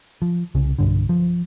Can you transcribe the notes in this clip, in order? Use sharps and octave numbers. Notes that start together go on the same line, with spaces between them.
F3
C2 C#3
B1 G2 D3
F3